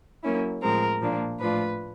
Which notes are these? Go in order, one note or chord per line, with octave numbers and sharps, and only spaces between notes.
F#3 A#3 C#4 E4
A2 F3 G#3 C4 A#4
A#2 F3 A#3 D4
A2 F3 A3 D4 F4 B4